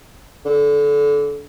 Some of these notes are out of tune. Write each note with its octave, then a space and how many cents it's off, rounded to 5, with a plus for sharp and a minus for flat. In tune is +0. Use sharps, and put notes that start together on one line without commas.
D3 -25